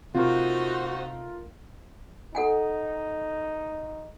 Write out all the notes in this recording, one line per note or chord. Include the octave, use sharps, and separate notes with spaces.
C3 A3 D#4 F4 F#4 A#4 C5
D#4 A4 F#5 G#5